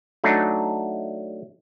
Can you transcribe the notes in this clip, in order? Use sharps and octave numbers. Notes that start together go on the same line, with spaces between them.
F#3 A3 D4 D#4